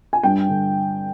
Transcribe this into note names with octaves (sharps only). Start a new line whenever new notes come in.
G#5
G2 G5
D3